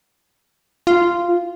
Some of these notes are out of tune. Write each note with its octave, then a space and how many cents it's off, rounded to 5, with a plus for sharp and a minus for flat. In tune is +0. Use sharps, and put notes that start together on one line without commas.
F4 -10